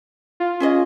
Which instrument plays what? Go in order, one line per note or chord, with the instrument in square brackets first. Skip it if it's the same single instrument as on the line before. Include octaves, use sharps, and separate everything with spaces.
[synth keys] F4
[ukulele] C#4 G#4 D#5